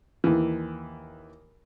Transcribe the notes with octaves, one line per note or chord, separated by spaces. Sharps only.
D#2 E3